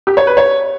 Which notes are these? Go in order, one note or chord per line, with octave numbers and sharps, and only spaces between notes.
G4
C#5
B4
C#5